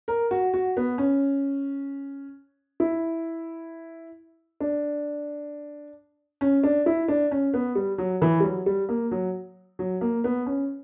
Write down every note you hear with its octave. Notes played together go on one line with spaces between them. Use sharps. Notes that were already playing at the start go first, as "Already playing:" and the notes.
A#4
F#4
F#4
B3
C#4
E4
D4
C#4
D4
E4
D4
C#4
B3
G3
F#3
E3
G3
F#3
G3
A#3
F#3
F#3
A#3
B3
C#4